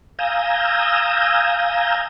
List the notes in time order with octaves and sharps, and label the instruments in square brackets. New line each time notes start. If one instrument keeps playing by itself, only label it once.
[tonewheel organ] F5 G#5 A#5 D#6 E6 G6